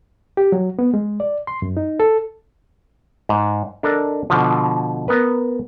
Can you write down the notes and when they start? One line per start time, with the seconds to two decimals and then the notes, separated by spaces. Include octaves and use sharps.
0.37 G4
0.52 F#3
0.79 B3
0.94 G#3
1.20 D5
1.47 C6
1.62 F#2
1.77 D#4
2.00 A4
3.29 G#2
3.83 D4 A4 A#4 D#5
4.30 B2 D3 F3
5.08 B3 A#4 B4